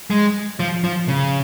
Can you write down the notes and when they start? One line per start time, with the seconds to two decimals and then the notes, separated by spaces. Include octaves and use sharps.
0.10 G#3
0.59 F3
0.84 F3
1.08 C#3